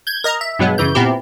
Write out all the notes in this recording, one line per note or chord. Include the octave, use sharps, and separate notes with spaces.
G6 G#6
A#4 D#5 A#5
E5
G2 B2 F#3 G#3 B3
F#2 C#3 E3 G6
A#2 B3 C4 E4 G4